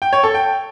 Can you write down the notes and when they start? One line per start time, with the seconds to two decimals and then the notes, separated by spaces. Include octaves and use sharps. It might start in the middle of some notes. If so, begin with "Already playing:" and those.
0.02 G5
0.13 C#5
0.23 A4
0.34 G5